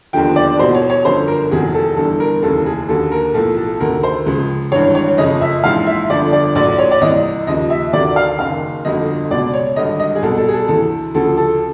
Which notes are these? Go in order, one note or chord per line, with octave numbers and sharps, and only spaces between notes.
E1 D#2 D3 F3 G5
D5
E2 B2 F#3 C5
C#5
C#5
G1 F#2 D3 F3 C5
A#4
F1 E2 C3 D#3 F#3 G#4
A4
G1 G2 E3 A4
A#4
F1 D#2 C#3 E3 A4
G#4
D#2 D3 F#3 A4
A#4
B1 A2 F3 A4
A4
D2 C3 D#3 A#4
C5
C#2 C#3 F3
G#1 G2 E3 C#5
C#5
F#1 F2 C#3 F3 D#5
E5
A#1 G#2 E3 F5
E5
G1 F2 D3 F3 D5
D5
A#1 A2 F#3 D5
C#5
D5
C2 C3 E3 D#5
D#2 C#3 F3 D#5
E5
D2 C3 D#3 F#3 D5
F5
F#1 F#2 D#3 F5
G1 F2 D3 F#3 D#5
C#2 B2 F#3 D5
C#5
G#1 G2 D3 D#5
D#5
G#4
C2 B2 F#3 A4
A4
G#4
A4
D2 C3 E3 A4
D2 C#3 F3 A4
A4